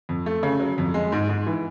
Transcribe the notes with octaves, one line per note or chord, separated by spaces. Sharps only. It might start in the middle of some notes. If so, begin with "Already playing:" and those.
F2
A3
C#3
F#3
F2
G#3
G#2
G#2
E3